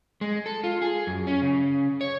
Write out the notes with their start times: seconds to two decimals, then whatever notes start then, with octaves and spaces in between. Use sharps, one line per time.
0.21 G#3
0.46 A4
0.64 F4
0.82 G#4
1.07 F#2
1.27 C#4
1.42 C#3
2.01 C#5